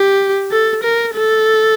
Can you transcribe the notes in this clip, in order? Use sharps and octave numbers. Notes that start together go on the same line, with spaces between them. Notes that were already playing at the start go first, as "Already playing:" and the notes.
Already playing: G4
A4
A#4
A4